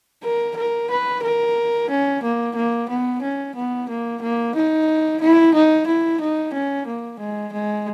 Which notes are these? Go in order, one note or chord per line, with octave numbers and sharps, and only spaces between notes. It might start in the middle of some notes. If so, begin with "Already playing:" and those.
A#4
A#4
B4
A#4
C#4
A#3
A#3
B3
C#4
B3
A#3
A#3
D#4
E4
D#4
E4
D#4
C#4
A#3
G#3
G#3